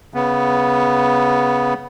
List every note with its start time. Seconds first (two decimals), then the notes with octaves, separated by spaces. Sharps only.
0.14 C#3 B3